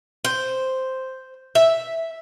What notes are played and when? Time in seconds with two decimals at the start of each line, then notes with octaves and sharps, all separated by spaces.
0.25 C5
1.55 E5